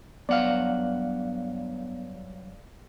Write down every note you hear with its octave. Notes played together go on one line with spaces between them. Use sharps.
G2 F#3 B3 D5 F5 F#5